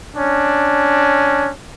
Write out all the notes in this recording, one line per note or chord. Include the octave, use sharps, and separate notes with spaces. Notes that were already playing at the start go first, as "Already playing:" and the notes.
C#4 D4